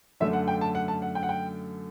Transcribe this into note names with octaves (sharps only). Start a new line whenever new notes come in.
F#2 D3 A3 E5
F#5
G5
A5
F#5
A5
F#5
G5
F#5
G5